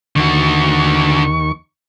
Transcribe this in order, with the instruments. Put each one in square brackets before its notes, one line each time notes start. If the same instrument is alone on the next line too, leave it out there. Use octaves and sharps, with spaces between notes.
[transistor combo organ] D#2 C#6 [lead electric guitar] D3 F#4